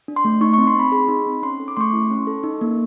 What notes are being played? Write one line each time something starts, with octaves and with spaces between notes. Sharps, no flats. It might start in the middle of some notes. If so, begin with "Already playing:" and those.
D4
C6
A3
D#4 C#6
C4 C#6
C6
C4 B5
G#4 B5
D#4
C4
C#4 C6
A4
D6
A3 C6 C#6
E4
C#4
A4
D#4
A#3